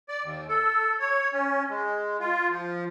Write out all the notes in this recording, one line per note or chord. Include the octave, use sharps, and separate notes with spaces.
D5
D#2
A4
C#5
C#4
G#3
F4
F3